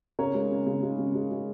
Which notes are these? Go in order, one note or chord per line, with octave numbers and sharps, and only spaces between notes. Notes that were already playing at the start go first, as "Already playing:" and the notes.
C#3 A#4 C#5
G#3
C#3
C#3
G#3
C#3
G#3
G#3